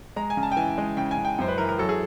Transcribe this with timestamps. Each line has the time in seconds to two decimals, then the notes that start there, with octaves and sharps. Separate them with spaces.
0.16 G#3 A#5
0.30 G#5
0.37 C#3
0.43 A5
0.52 G5
0.57 E3 G#5
0.78 G#3
0.97 C#3 G5
1.11 G#5
1.18 C#3
1.25 G5
1.39 F#2 C5
1.48 B4
1.58 E3 A#4
1.69 A#4
1.78 F#3 A4
1.89 G#4